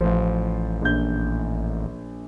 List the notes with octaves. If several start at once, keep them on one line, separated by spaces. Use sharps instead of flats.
A1 F3
A#1 G6